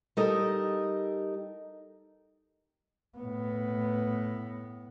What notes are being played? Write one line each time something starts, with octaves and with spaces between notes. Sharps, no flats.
G3 D#4 A4 A#4 D#5
A2 B3